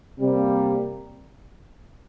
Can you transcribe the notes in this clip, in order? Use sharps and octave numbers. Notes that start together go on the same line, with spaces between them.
C3 G3 A#3